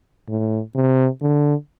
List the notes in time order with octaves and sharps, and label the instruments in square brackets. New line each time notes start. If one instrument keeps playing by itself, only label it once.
[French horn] A2
C3
D3